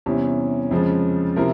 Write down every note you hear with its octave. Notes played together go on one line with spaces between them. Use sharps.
E2 C3 G3 C#4
F2 C#3 F3 G#3
C3 F3 C4 E4 A#4